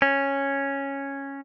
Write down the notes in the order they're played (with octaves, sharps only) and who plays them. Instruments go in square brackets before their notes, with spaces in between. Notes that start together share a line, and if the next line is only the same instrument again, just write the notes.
[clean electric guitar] C#4